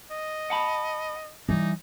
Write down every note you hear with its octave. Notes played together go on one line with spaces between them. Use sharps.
D#5
F#5 A5 B5
E3 G3 D#4